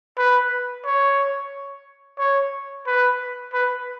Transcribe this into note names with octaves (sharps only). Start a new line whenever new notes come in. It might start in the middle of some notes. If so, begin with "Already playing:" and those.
B4
C#5
C#5
B4
B4